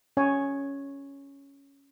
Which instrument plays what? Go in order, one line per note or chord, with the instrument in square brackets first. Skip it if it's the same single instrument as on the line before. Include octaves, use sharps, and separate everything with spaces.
[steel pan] C#4 C#5 G#5